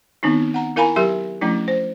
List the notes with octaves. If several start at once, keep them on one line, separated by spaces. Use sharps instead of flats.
D#3 B3 C4 D4 D#4
F#5 A#5
E4 A#4 F5 G#5 A#5 B5
F#3 G4 A#4 E5 C6
F3 A3 C#4 D4 E4
C5